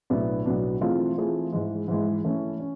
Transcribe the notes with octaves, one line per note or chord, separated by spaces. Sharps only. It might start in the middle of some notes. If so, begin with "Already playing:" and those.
B1 A2 F#3 B3 D4
B1 A2 F#3 B3 D4
E3 A3 C4 F4 G#4
E3 A3 C4 F4 G#4
G#2 E3 G#3
G#2 E3 G#3
E3 A3 C#4
C#4